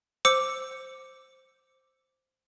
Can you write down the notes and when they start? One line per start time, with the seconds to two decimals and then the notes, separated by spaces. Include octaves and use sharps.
0.25 C5 D6 E6 C#7